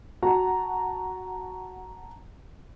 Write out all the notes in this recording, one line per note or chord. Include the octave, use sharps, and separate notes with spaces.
F#4 F#5 A5 A#5